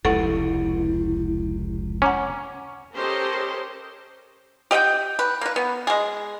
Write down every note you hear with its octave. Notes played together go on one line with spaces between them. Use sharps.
F1 C#2 C3 E4 A4 F#5 C#6
C#4 F#5 A#5 D6
C#4 G4 A4 A#4 C5 D#5
G4 D#5 F#5 G5
B4
A#3 B4
B3
G#3 G#4